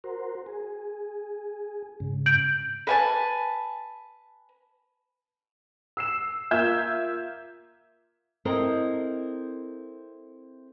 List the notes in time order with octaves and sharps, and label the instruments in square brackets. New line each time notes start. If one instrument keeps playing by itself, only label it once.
[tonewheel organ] F#4 A#4 C5
G#4
G#2 C#3
[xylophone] G6 D7 F#7
[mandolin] B4 G#5 A5
[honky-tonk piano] E6 C7 E7
A#3 F4 E5 G6 G#6 E7
[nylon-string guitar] C4 E4 A4 A#4 D#5